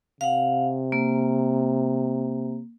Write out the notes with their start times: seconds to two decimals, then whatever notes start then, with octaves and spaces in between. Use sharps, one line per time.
0.21 C3 F5 F#5
0.92 A#3